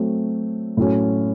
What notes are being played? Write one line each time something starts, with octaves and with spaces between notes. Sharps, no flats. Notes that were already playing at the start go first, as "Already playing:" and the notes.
Already playing: F#3 A3 C4
A2 F#3 C#4